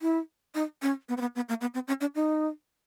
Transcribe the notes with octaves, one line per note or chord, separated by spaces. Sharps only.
E4
D#4
C#4
B3
C4
B3
B3
A#3
B3
C4
C#4
D4
D#4